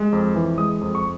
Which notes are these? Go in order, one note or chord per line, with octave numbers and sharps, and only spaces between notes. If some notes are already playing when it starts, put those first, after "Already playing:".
Already playing: G#3
F2
E3
G#3 D#6
F2
C#6